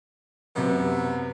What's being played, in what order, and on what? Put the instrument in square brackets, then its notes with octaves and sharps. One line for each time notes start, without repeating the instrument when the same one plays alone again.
[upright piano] F#2 C3 [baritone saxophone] B3